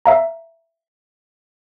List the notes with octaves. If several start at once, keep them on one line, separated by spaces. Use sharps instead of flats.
E5 F5 A#5